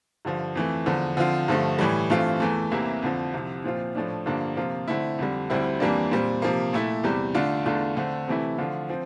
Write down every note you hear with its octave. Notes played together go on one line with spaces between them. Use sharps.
G2 D3 F3
F2 E3 A3
E2 D3 F3
D3 F3 C4 F4
G2 D3 F3 A3
A2 E3 G3
G2 E3 A3 C4 F4
E2 E3 A3
C2 C3 E3 A#3 E4
F2 D3 F3
C2 C3 F3
A#2 F3 C4 F4
A2 F3 A3 D4
G2 D3 F3 A#3 D4
C3 F3 A#3 F4
D3 A3 C4 E4
F2 D3 G3
D2 D3 G3 C4 E4
F2 E3 G3 A#3 D4
A#2 G3 C4
C3 F3 A#3
A#2 A3 E4
E2 C3 G3
D3 A3 D4 F4
E2 D3 A3 D4 F4
D3 A3 C4
C3 E3 A3 E4
D3 F3 A3 D4 F4
F3 C4